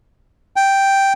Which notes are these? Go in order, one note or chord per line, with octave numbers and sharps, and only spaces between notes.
G5